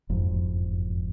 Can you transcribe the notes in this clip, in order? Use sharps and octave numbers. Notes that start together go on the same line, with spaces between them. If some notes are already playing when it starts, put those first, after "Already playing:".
F#1 F2 G#2